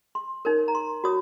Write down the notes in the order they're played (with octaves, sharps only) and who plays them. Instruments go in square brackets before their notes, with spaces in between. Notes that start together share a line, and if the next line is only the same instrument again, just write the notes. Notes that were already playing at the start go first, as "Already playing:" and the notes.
[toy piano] C6
D#4 A#4 C#5
A#5
C6
F#4 C#5 D#6